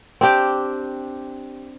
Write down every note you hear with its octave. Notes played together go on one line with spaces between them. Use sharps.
C4 D4 G4 G5